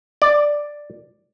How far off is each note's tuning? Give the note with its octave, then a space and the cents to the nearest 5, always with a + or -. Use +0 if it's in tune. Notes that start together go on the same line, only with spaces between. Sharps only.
D5 +5